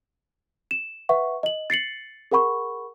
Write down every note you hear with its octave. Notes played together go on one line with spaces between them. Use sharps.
E7
B4 E5 F#5 C#6
D#5 F#7
A6 C7 C#7 F#7
G#4 A#4 F#5 B5 C#6